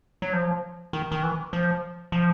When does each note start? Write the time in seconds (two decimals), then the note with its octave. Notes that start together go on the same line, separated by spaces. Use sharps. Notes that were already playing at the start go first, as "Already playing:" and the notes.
0.22 F#3
0.33 F3
0.93 D#3
1.12 D#3
1.23 E3
1.53 F3
2.12 F3